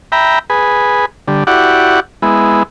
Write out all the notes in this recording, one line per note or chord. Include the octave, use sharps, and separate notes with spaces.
E5 G5 A#5 B5
G#4 B4
D3 G3
E4 F#4 G4 D5 F#5
G#3 B3 E4